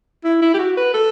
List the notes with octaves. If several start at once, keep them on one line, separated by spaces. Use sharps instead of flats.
E4
E4
G4
F#4
B4
A4